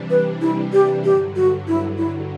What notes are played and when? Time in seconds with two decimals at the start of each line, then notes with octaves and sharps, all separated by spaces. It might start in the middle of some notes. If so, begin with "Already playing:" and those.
Already playing: C3 E3 G3 D4
0.10 B4
0.41 E4
0.73 G4
1.05 G2 D3 F#3 G4
1.36 F#4
1.68 E4
1.98 E4